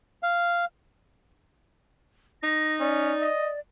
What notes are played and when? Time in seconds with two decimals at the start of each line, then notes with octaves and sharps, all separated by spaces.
0.23 F5
2.43 D#4 A#6
2.80 C#4 D5
3.22 D#5